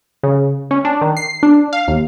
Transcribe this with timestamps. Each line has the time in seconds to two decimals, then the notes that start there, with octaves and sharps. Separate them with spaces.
0.23 C#3
0.71 C#4
0.85 D4
1.01 D#3
1.17 C7
1.43 D4
1.73 F5
1.88 D#2